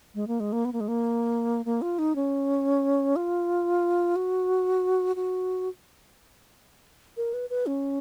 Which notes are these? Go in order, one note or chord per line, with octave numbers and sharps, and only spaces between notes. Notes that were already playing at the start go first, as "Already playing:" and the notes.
G#3
A#3
G#3
A#3
B3
A#3
G#3
A#3
A#3
F4
D#4
C#4
F4
F#4
F#4
A#4
B4
B4
C#4